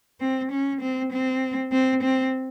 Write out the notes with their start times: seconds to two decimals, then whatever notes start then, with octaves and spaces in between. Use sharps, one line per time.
0.21 C4
0.52 C#4
0.81 C4
1.12 C4
1.72 C4
2.03 C4